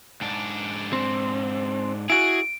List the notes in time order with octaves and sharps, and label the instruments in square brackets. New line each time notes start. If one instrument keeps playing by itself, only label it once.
[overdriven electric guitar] G#2 D4
[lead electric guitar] C4
[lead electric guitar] E4 F#4 [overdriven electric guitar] G#4 [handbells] D7